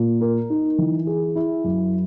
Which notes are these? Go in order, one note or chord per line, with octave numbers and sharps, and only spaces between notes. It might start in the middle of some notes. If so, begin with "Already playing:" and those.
Already playing: A#2
A#4
D#4
E3
G#4
E4
F#2